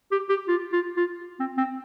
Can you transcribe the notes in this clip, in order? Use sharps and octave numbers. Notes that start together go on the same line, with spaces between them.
G4
G4
F4
F4
F4
C4
C4